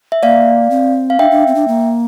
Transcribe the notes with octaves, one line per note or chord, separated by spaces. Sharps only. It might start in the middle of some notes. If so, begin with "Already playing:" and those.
E5
A#3 D5 F5
C4
F5
D4 E5 G5
D4
C4
D4
A#3